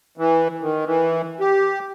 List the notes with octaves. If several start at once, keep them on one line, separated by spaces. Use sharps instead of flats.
E3
D#3
E3
G4